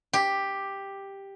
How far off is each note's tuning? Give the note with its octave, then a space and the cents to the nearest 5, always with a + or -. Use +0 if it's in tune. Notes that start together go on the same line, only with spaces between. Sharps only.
G4 +5